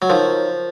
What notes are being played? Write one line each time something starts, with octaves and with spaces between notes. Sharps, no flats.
F#3
F3 D#4 A#4 C#5